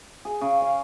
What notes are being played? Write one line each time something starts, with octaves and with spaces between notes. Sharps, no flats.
G#4
C#3
F5